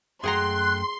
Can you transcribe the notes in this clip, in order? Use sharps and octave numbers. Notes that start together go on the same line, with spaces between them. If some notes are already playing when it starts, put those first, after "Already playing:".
F#2 A3 G#4 F#5 G5 A#5 C6 F#6